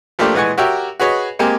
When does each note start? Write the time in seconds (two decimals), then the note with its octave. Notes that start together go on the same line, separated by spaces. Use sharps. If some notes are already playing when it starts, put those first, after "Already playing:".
0.19 F3 A3 A#3 D4 G4 C5
0.34 A#2 E3 G#3 F#5 G#5 C#6
0.58 F#4 G4 A#4 C#5 E5 G5
1.00 F#4 G#4 B4 C#5 D#5
1.39 G#3 A#3 C4 G4 G#5